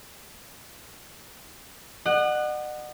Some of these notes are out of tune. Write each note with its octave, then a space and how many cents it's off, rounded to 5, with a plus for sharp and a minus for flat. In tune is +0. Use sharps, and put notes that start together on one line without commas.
D#5 -45 F#5 +0